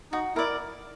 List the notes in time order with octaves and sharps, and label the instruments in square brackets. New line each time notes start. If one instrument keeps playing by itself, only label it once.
[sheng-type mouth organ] D#4 [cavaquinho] F#4
[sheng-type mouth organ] E4 [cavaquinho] A#4 D5